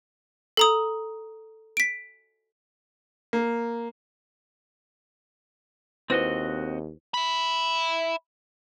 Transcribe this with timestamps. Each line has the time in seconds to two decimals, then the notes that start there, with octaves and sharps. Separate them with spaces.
0.57 A4 A#5 D#6
1.77 B6 D7
3.33 A#3
6.10 D#2 C4 E4 F#4 B4 C5 D#5
7.14 E5 B5